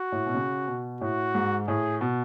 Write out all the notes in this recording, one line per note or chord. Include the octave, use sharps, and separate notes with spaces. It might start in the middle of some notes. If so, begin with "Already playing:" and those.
Already playing: F#4
A2
B2
C#3
B2
A2 F#4
G#2
A2 G#4
B2